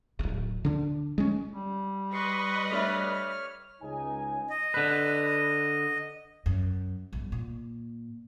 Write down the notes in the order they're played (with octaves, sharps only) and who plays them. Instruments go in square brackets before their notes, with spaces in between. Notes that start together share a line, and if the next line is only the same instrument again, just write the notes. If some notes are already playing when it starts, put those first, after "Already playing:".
[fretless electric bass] D1 G#1
D3 D4
G#3 C#4
[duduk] G3
[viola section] B4 D#5 [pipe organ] C6 C#6
[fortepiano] A3 D4 E5 [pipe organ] C#5 F6
[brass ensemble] C#2 D#4 G#5
[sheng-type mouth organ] D#5
[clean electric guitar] D3 B4
[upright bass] F#2
B1 G2
A#2